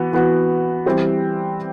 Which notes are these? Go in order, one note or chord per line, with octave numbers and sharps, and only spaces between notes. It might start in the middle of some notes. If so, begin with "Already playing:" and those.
Already playing: E3 B3 F#4
E3 B3 F#4
E3 G3 C4 E4 G4